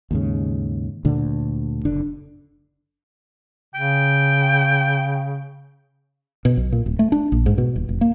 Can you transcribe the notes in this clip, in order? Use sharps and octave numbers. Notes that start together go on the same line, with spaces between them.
D#2 G#2 C#3
D2 A#2 D3 D4
F#1 D3 D4
C#3 G5
B2
B1
A#2
D1
A3
D4
A#1
G#2
B2
D#1
F1
A#3